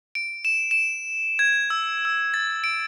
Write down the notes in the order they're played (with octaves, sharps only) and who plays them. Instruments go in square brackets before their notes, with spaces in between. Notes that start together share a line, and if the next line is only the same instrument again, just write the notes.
[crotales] D7
E7
E7
G#6
E6
E6
A6
D7